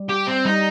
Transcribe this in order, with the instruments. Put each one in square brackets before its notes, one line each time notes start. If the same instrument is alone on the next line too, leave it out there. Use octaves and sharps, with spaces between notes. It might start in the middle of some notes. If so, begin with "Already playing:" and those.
Already playing: [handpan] G3
[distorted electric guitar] G4
C4
[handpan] G3 [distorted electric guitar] D#4